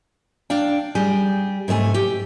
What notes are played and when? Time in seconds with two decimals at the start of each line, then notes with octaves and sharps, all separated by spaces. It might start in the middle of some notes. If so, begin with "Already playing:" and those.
0.50 D4 F5 G5
0.95 G3 G4 G#4
1.68 G#2 C3 A3 G#5
1.94 G4